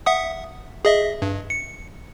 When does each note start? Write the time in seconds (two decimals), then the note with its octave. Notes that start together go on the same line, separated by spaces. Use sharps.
0.06 E5 F#5 D#6
0.85 G#4 D#5 E5
1.22 G2
1.50 C#7